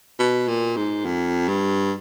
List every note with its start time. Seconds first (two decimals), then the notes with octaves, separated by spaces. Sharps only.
0.19 B2
0.48 A#2
0.77 G#2
1.05 F2
1.48 G2